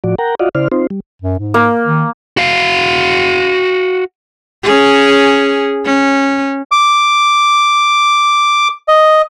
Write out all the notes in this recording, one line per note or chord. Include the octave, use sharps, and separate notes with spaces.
A2 F3 F#4 D5
A#4 F#5 G5 A#5
F4 F#4 D5 D#5 F5 F#5
C#3 E4 C5 D5 F6
C4 D#4 F4 C5
G3
F#2
G#2
A#3
D#3
F#4 F5
C#4 G#4
C#4
D6
D#5